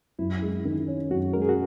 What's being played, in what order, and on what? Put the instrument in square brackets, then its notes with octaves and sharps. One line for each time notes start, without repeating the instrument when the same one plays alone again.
[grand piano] F#2 [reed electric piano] E4
[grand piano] G#3
D#3
C#4
[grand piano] F#2 [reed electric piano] F#4
[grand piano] G#3 [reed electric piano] A#4
[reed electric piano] G#4
F#4